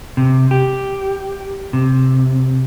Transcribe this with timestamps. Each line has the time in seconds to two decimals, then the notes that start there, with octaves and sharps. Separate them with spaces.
0.17 C3
0.51 G4
1.73 C3